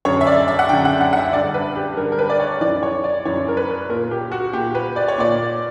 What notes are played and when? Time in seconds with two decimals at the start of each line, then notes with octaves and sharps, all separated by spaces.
0.05 F#2 D3 C#5
0.21 E5
0.27 D5
0.48 E5
0.59 F#5
0.69 D3 G5
0.73 F#2
0.85 F#5
1.01 F#5
1.13 F#5
1.17 E5
1.33 G2 D3 D5
1.54 B4
1.76 G4
1.97 G2 D3 A#4
2.12 A#4
2.19 B4
2.30 D5
2.40 C#5
2.61 F#2 E3 D5
2.83 C#5
3.04 D5
3.25 F#2 E3 C#5
3.48 A#4
3.57 B4
3.89 A#2 A#4
4.11 G4
4.32 F#4
4.53 A#2 G4
4.75 B4
4.96 D5
5.08 C#5
5.18 A#2 D5